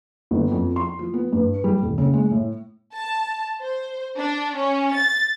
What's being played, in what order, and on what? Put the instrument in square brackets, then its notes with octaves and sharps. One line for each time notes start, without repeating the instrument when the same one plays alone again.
[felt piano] G1
F2
C6
F3
B3
G2
G3
D#1
C#3
G#3
A2
[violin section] A5
C5
D4
C#4
A6